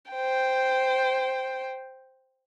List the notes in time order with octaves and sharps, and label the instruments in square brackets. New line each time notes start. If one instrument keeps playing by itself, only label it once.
[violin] C5 G5